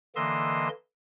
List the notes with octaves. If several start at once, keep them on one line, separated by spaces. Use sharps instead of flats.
D3 E3 A#3 D#5 C6 E6